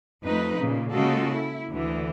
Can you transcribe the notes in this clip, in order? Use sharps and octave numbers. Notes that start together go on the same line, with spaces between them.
F2 A3 D#4 B4
A#2 C#3
C#3 G#3 A#3 F4 F#4 A4
E4
D2 D3 E3